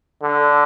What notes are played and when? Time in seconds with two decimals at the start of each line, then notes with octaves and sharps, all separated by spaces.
0.22 D3